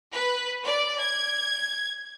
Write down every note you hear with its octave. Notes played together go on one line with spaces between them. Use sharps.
B4
D5
G#6